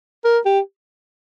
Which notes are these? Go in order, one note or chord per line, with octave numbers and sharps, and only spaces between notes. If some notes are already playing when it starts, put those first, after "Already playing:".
A#4
G4